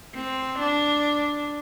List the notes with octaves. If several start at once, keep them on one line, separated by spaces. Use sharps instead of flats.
C4
D4